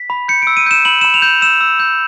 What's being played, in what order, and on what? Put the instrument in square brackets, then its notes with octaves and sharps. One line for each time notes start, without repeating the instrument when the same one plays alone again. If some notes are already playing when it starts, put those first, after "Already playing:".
Already playing: [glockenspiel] B6
B5
G6 C#7
E6 D7
D#7
G6 E7
B5 F#7
B5 E7
F7
G6
E6 E7
E6
G6